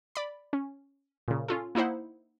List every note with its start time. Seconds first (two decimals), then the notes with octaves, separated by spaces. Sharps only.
0.15 D5 B5
0.53 C#4
1.28 A#2 C#3
1.48 C#4 F4 A4
1.75 A#3 D#4 E4 C5 F#5